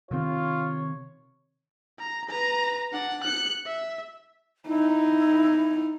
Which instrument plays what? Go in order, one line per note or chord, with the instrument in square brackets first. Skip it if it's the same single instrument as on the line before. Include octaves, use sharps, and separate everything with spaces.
[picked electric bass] C3 D#3 C4 [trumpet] F4 [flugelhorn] C#5
[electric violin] A#5
B4 A#5
D4 F#5
F#6 C#7
E5
[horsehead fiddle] D#4 [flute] E4